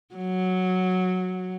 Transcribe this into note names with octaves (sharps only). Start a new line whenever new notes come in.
F#3